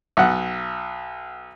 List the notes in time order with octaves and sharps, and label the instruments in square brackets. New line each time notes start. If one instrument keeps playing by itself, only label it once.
[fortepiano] B1 F#5